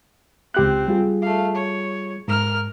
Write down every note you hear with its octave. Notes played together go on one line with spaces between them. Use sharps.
C#2 C4 G4 F#6
G3 F4 G#4
A3 F5
C#5
G#2 A#4 F6